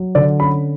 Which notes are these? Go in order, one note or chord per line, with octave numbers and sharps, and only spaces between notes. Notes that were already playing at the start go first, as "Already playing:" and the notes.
Already playing: F#3
D3 D5
C#4 B5